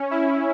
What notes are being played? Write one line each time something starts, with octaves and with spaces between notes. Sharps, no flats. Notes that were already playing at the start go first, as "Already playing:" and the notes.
Already playing: C#4
E4